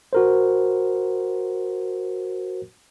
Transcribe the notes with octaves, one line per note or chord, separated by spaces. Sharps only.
F#4 A#4 C5